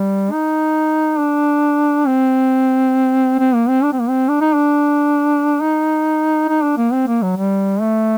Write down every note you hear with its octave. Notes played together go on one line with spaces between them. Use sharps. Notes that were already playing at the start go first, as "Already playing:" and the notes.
Already playing: G3
D#4
D4
C4
C4
A#3
C4
D4
C4
A#3
C4
D4
D#4
D4
D#4
D#4
D4
A#3
C4
A#3
F#3
G3
A3